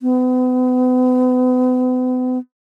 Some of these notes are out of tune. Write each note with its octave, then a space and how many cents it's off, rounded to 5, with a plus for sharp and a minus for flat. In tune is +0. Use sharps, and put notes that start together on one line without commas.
B3 +40